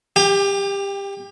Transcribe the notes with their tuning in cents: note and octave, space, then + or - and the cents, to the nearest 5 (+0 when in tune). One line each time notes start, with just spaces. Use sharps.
G4 +20 G5 +45